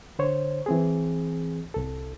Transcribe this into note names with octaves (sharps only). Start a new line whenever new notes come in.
D3 C5 C#5
E3 C4 G#4
C2 A4